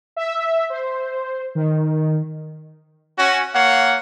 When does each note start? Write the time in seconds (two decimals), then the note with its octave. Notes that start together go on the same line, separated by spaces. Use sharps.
0.16 E5
0.70 C5
1.55 D#3
3.18 C#4 F#4
3.54 A#3 C#5 F5 F#5